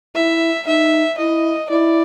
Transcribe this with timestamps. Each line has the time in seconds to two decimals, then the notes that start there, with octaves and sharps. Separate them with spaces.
0.15 E4 E5
0.67 D#4 E5
1.18 E4 D#5
1.70 E4 D5